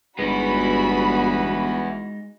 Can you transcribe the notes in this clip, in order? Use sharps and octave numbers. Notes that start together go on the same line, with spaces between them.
G1 G#3 B3 D#4 E4 F#4 B5